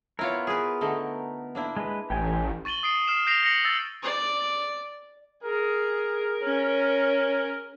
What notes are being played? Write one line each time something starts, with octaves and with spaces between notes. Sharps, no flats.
B3 E4 F4 A#4 C#5
G#4 B4
D3 A3 D#4
A#3 D4 E4
G#3 B4
A1 G4 G5 G#5
C#6 A6 D#7 F#7 G7
D#6 C7 D7
F6 C7 E7
G6 A#6 C7 D7 F7
A#6 C#7 D7 F#7
E6 A6
D5
G#4 A#4
C#4